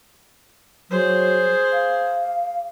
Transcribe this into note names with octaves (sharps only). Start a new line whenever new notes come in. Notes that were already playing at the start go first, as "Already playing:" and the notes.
F#3 G#4 C5
F5